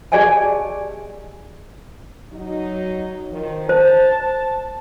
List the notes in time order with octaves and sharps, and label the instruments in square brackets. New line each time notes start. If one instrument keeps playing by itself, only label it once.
[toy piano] G4 G#4 D5 D#5 G#5 A5
[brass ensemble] F#3 D#4
D#3 F3
[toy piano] C5 [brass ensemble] A5